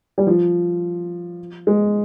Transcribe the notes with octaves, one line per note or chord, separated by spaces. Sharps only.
G3
F3
G#3